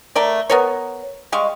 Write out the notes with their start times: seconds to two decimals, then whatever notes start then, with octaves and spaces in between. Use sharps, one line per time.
0.15 A3 A#4 D5
0.50 B3 A#4 C#5
1.32 G3 G#3 F5 C#6